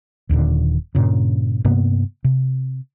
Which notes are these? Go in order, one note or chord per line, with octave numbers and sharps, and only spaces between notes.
D#1 D#2 A#2 D3
G2 A#2 C#3
G2 C3 A#3 B3
C3